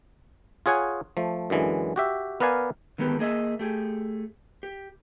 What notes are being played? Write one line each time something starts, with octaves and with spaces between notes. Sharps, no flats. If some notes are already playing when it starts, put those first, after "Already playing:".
F4 G#4 C#5 F#5 G#5
F3 A3
F#2 D3 E3 G#3
F#4 G4 E5
B3 A#4 B4 D5 F5 G#5
D3 D#3 G#3 B3 G4
A#3 G#4 D#5 E5
A3 G4 G#4
G4